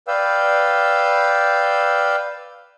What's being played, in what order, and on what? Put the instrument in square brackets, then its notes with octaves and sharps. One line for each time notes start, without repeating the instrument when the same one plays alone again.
[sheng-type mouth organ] B4 D5 F5 G5 E6